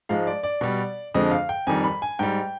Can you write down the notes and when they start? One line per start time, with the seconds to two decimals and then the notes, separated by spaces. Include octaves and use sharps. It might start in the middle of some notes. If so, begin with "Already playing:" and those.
0.09 G#2 F3 G#3 F5
0.27 D5
0.43 D5
0.61 B2 G3
1.14 F2 D3 F3 G#3 D#5
1.31 F5
1.49 G5
1.67 F2 D#3 G3 G#5
1.84 B5
2.02 G#5
2.19 G#2 G3 G5